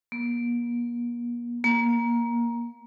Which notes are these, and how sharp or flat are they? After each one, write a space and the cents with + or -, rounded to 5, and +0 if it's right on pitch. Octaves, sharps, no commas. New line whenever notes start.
A#3 +45
A#3 +15